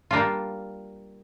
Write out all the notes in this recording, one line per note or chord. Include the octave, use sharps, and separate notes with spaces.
G3 A#3 D4 F4